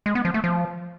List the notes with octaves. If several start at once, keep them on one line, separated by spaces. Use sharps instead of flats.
G#3
B3
F3
A3
F3